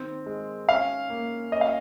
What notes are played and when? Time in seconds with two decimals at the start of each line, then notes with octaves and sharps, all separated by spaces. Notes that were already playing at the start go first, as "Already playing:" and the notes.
Already playing: D#3 C4
0.26 G#3
0.68 C#4 F5
1.10 A#3
1.52 C#4 D#5
1.61 F5